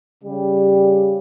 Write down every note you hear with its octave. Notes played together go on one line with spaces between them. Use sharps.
C#3 G3